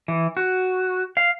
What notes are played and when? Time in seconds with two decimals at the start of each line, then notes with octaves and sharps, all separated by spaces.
0.08 E3
0.37 F#4
1.17 F5